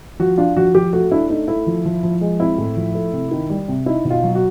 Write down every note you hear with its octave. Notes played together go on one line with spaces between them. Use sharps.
F3 F#4
D4 F4
F3 F#4
F3 G4
A3 F#4
D4 E4
A3 D#4
A3 E4
F3
F3
F3
G#3
C4 E4
A2
F3
A3
C3
D#3
G3
C3
D#4 E4
B2
F4
F#3
F#4